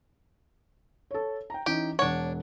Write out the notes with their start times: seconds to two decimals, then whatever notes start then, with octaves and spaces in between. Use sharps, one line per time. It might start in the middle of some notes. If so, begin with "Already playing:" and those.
1.11 A4 C#5
1.50 G5 A#5
1.66 E3 C#4 D#4 G4
1.99 E1 D4 C#5 F#5